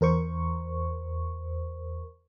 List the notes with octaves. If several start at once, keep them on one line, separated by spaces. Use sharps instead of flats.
E2 A#4 C5 C#6